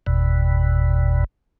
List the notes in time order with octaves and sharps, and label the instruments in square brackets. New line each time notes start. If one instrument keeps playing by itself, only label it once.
[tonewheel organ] G1 E2 B2